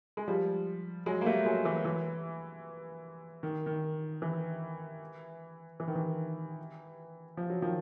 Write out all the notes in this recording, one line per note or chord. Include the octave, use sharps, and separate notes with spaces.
G#3
F3 G3
F#3 G#3
A#3
G3 A3
F#3 G#3
E3
E3
D#3
D#3
E3
E3
D#3
E3
F3
F#3
D#3 F3